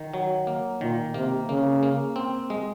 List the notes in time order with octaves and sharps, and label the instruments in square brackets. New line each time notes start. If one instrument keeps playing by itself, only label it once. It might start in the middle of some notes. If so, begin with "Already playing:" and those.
Already playing: [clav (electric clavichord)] D#3
F#3
A#3
[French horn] A#2 [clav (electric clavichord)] D#3
[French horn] C3 [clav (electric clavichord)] A#3
[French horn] C#3 [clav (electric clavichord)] A#3
[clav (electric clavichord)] A#3
C4
G#3